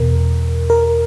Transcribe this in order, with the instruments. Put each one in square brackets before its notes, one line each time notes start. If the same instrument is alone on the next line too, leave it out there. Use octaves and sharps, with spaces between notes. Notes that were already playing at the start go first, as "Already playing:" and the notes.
Already playing: [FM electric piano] E2 B2 A#4
A#4